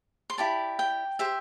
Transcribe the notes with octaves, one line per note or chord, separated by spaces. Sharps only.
C6
E4 G4 D5 A5
G5
G4 C5 E5